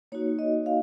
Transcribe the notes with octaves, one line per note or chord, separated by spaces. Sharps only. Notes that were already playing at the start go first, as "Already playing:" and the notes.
A#3 D#4 F#4 C#5
D#5
F5